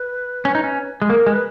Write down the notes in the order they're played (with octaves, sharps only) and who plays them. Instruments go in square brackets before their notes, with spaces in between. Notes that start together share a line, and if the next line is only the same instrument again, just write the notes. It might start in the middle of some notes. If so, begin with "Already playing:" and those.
Already playing: [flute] B4
[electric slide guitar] C#4
D#4
C#4
G#3
[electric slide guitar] A#3 [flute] A#4
[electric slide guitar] G#3
[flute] B4